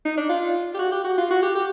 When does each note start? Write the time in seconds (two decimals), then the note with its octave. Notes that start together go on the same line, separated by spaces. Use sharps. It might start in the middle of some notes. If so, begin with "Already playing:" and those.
0.05 D#4
0.18 D4
0.29 F4
0.74 G4
0.79 F#4
0.92 G4
1.04 F#4
1.18 F4
1.30 F#4
1.42 G4
1.55 G4